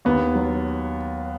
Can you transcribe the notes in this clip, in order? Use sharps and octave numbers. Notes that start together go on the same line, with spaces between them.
D#2 B3
F#3